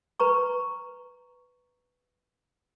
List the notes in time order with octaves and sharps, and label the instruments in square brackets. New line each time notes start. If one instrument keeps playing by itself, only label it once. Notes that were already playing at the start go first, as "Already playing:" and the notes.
[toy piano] B4 A#5 C#6